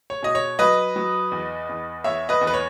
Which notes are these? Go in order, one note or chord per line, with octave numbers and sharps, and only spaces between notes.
C#5
B2 D#5
C#5
F#3 B4 D#5
F#3
E2
E2
E2 C#5 E5
B4 D#5
E2
B4
C#5